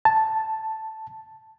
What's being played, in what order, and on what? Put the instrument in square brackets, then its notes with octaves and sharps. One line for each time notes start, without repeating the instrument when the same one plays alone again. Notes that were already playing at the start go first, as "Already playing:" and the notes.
[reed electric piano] A5